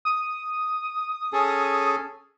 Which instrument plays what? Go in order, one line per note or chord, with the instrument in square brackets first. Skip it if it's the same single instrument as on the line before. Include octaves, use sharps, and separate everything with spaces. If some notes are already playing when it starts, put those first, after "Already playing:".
[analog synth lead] D#6
[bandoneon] C#4 G#4 A4